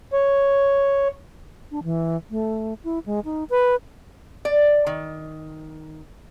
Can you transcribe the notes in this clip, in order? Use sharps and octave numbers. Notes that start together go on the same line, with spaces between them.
C#5
D4
E3
A3
E4
G#3
D#4
B4
D5
D#3